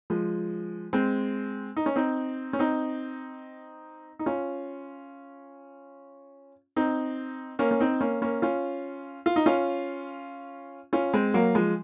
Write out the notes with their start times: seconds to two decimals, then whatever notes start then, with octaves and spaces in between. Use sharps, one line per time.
0.10 F3 G#3
0.93 G#3 C4
1.76 D#4
1.86 C#4
1.96 C4 D#4
2.53 C#4
2.59 C4 D#4
4.19 D#4
4.26 C#4 F4
6.76 C4 D#4
7.59 A#3 C#4
7.71 C#4
7.80 C4 D#4
8.01 A#3 C#4
8.22 A#3 C#4
8.42 C#4 F4
9.26 F4
9.36 D#4
9.46 C#4 F4
10.93 C#4 F4
11.14 G#3 C4
11.34 F#3 A#3
11.55 F3 G#3